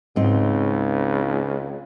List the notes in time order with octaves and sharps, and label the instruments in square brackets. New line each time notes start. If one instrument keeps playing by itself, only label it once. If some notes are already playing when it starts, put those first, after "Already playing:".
[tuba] C#2 [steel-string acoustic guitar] G#2 C4 D#4